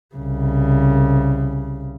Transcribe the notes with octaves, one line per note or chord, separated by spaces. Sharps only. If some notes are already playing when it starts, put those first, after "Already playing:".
C2 C#3